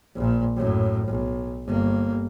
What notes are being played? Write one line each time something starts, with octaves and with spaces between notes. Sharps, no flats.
A#1 A#2
F#2 A2
B1
G1 A#3